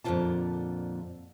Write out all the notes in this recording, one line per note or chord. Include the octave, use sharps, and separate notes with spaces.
F2 A#2 D3 F3 F4 A5